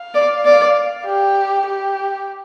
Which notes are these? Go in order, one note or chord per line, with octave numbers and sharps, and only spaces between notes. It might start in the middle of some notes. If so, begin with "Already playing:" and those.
Already playing: F5
D5
D5
G4
G4